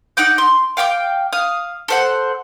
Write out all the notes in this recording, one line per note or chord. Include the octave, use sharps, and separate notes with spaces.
D#4 F#5 D6 G6
C6
F5 G5 C#6 D6
F5 D#6
A4 C5 F#5